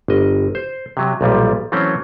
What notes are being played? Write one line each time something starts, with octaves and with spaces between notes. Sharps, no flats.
G1 D#5
C5
C3 F#3
B1 A#2 F3 G3
E3 F#3 A3 C4 C#4